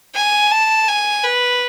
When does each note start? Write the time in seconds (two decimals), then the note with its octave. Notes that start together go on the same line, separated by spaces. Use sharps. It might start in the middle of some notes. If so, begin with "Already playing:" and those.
0.15 G#5
0.51 A5
0.88 G#5
1.24 B4